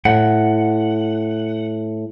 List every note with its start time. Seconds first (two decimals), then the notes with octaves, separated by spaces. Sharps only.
0.05 A2 F#5